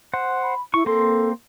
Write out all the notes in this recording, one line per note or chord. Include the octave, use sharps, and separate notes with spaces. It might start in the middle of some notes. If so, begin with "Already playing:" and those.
C5 F#5
B5
E4 C#6
A#3 C4 A4 C6